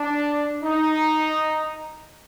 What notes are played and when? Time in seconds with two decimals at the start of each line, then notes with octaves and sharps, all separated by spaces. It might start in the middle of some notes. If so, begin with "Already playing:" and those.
Already playing: D4
0.63 D#4